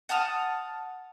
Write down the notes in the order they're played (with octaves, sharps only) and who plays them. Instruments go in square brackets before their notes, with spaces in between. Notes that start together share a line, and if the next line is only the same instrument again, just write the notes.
[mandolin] F#5 A5 D#6 F6